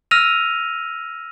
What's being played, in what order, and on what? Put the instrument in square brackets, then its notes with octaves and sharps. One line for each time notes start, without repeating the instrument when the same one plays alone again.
[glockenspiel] E6 F6 A#6 D#7 F7